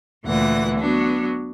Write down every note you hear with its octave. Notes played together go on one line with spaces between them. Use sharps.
D2 A#2 E3 F#5
F#3 B3 D4